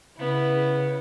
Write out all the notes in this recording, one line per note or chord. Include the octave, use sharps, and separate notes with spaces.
C#3 B3 E4